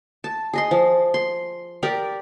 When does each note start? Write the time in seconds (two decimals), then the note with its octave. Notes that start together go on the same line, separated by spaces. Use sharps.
0.24 A5
0.53 G#4 D#5 C6
0.71 F3
1.14 C6
1.83 G4 A#4 D5